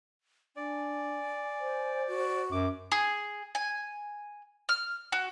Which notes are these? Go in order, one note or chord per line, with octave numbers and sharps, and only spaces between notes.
D4 D5 G#5
C5
F#4
F#2 D6
G#4
G#5
F6
F#4